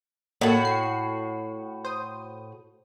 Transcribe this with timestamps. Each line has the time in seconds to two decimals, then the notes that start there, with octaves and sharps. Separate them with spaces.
0.41 A2 A#3 F#4 A4
0.65 C7
1.85 C5 D#6